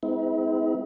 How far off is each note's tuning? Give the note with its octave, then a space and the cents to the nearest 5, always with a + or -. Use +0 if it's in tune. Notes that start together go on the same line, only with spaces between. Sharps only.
G#3 +0 C4 -40 E4 -45